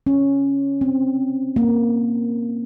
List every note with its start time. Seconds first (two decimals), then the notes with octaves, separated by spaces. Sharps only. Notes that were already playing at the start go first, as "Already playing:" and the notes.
0.07 C#4
0.81 C4
1.56 A#3